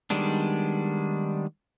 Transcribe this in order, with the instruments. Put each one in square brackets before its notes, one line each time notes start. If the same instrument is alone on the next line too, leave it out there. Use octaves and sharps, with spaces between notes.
[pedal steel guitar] D#3 G3 G#3 B3 D4